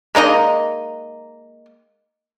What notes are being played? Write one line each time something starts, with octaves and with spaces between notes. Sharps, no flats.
G#3 A#3 D#4 D#5